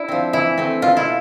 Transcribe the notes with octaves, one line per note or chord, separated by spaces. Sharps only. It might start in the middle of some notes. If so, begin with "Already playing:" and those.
Already playing: D4 E4
F3 C4
E3 E4
A3 C4
B2 F4
E4